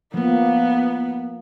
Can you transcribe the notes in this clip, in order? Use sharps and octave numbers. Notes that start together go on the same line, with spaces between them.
F3 A#3 B3